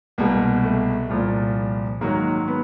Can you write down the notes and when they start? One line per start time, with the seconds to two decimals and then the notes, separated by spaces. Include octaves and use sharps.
0.18 C2 B2 G#3 A#3
0.64 A3
1.09 C2 A#2 F3
2.01 G#2 D#3 F#3 A#3
2.48 B3